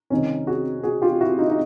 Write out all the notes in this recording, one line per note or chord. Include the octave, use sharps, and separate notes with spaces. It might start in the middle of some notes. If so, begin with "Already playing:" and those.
C2 C3 D#3 C#4 D#4
F#4 G#4
F#4 G#4
F4 G4
E4 F#4
D#4 F4
D#4